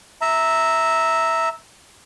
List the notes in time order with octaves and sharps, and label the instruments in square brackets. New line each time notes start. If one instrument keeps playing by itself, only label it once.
[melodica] E5 A#5